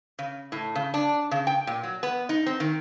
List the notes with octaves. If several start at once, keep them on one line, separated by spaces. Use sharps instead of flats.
C#3
A2
C#3
D4
C#3
G5
A#2
F#3
B3
D#4
C4
D#3